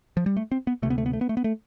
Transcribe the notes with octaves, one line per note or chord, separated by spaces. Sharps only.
F3
G3
A3
C4
B3
D2 C3 A3
B3
A3
B3
A3
B3
A3
B3
A3